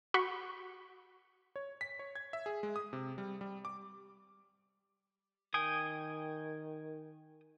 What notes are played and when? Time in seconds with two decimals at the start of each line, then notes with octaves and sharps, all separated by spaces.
0.14 F#4 B5 C#6
1.56 C#5
1.81 B6
1.99 C#5
2.15 G#6
2.33 E5
2.46 G#4
2.63 G#3
2.76 D#6
2.93 C3
3.18 G3
3.41 G3
3.65 D6
5.54 D#3 G5 G#5 D#6